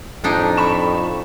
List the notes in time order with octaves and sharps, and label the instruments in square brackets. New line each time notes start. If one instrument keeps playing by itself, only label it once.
[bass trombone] F2 [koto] A2 D4 D#4
[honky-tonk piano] B5 C#6 E7